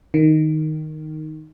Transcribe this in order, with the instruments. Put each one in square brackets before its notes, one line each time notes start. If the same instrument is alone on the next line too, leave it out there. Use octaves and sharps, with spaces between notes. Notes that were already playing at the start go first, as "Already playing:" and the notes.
[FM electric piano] D#3